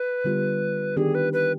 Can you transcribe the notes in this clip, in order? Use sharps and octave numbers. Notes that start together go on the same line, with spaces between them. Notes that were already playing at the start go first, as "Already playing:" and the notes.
Already playing: B4
D3 G3 B3 F4
D#3 B3 D4 G4 G#4
B4
B4